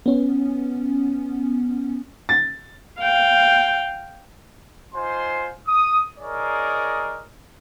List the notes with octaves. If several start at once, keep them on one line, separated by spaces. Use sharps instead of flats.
B3 C#4
A6
F5 G5
D#4 F4 C5 G#5 C6
D#6
D#4 G#4 A#4 C#5 D5